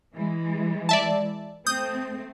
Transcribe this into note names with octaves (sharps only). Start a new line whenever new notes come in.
E3 G#3
D5 E5 A5
A3 C4 D#6 G6